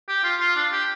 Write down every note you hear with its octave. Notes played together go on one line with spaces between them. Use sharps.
G4
F4
F4
D4
G4